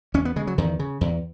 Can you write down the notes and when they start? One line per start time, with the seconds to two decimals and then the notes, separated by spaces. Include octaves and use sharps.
0.14 E2 C#4
0.25 B3
0.36 C#3 G#3
0.47 F#3
0.58 E2 D#3
0.79 C#3
1.01 E2